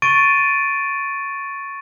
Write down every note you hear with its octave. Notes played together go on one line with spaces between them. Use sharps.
C#6 A6 D7 D#7